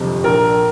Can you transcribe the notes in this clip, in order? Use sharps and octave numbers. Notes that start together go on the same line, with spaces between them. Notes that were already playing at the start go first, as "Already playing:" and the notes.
Already playing: G1 F2 C3
A#1 A#4